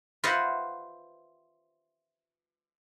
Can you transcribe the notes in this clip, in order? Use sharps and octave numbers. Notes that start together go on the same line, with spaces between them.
F4 B4 C5 D#5 E5 F#5